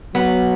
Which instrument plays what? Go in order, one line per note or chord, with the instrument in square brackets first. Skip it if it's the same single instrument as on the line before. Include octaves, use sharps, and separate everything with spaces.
[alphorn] F#3 [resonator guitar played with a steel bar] B3